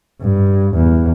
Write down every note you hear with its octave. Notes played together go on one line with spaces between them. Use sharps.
G2
E2